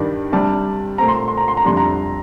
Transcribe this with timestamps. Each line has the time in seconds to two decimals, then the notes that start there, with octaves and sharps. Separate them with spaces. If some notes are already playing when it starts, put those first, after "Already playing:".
Already playing: G2 D#3 G3 D4
0.32 C3 G3 D4 A5
0.98 A#2 A3 C4 A#5
1.08 C6
1.18 A#5
1.28 C6
1.37 A#5
1.48 C6
1.57 A#5
1.65 F2 C3 G3 D4 C6
1.77 A#5